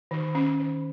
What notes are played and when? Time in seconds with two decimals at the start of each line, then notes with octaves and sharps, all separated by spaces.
0.11 D#3
0.35 C#4
0.60 D#3